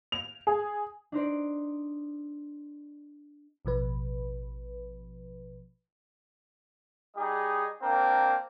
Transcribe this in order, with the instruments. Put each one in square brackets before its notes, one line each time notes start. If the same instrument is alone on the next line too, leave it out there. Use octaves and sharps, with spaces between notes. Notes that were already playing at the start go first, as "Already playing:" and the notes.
[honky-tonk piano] F7
G#4
[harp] D4 D#4 C5 D5
[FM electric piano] A1 B2 F3 B4
[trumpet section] G3 D#4 G#4 D#5
A#3 C4 D4 A#4